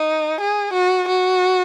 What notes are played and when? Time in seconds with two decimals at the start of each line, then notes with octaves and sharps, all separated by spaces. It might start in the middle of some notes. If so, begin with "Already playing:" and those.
Already playing: D#4
0.41 G#4
0.73 F#4
1.08 F#4